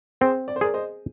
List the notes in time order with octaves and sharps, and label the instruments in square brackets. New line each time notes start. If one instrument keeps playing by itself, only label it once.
[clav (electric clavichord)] C4 [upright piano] G#4 C5
[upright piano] D5
C5
[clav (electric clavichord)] G#4 [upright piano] A#4 D5
[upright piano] C5 D#5